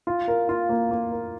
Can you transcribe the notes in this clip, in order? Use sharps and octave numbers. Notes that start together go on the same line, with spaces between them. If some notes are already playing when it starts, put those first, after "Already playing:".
F4
A#4
F4
A#3
A#3
A#4